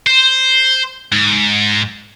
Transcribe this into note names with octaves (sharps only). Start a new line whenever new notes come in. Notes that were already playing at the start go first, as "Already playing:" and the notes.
C5
G#2